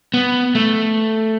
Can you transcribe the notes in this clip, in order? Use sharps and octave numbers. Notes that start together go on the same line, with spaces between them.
B3
A3